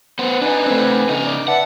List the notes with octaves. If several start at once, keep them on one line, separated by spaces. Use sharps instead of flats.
B3 C5
D4 D#4 B4 G#5
A3 C4
C#3 D#4
D5
B4 E5 F#5 A5